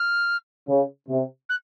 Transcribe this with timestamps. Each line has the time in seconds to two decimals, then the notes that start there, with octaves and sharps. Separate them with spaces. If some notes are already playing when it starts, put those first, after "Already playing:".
Already playing: F6
0.69 C#3
1.09 C3
1.49 F#6